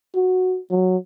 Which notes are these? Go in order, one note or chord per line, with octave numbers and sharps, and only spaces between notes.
F#4
F#3